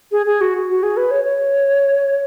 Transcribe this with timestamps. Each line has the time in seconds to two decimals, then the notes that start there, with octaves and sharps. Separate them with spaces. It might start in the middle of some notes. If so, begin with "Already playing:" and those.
0.12 G#4
0.26 G#4
0.41 F#4
0.69 F#4
0.83 G#4
0.97 B4
1.11 C#5
1.25 C#5